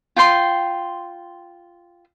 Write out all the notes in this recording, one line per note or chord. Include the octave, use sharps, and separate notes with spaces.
F4 G5 C6